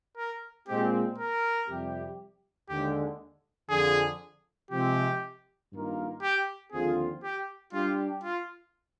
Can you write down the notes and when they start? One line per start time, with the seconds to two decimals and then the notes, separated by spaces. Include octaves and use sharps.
0.17 A#4
0.67 A#2 G#3 C4 G4
1.18 A#4
1.68 F2 C3 G3 C4 G4
2.69 D#2 D3 G#3 G4
3.70 F2 D3 F3 G#4
4.71 C3 F3 G#3 C4 G4
5.72 G2 D#3 A#3 F4 A#4
6.22 G4
6.72 D#2 D3 F3 C4 F4 G#4
7.23 G4
7.73 G3 D4 F4 G4
8.24 F4